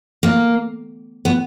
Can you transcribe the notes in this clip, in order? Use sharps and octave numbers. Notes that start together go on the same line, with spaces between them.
A#3
B3